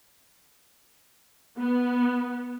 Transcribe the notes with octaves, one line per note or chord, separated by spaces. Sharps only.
B3